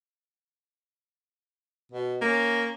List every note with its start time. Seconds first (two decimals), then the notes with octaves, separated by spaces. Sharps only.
1.92 B2
2.22 A#3 C#4